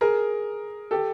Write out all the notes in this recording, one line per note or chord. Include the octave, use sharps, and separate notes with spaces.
G#4 A#4
G4 A4